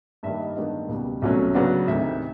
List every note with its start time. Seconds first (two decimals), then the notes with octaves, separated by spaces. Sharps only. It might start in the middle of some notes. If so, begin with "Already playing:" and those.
0.23 G2 D#3 G3 A#3 E5
0.40 D#5
0.56 G2 D#3 G#3 B3 D4 D#5
0.89 C#2 B2 G3
1.22 C2 B2 F#3 A3 C#4
1.55 C#3 F#3 B3 D4
1.88 D2 C3 D#3 E5